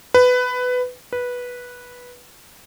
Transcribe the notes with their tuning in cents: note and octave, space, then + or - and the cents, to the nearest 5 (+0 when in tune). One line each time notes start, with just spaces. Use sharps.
B4 +15
B4 -10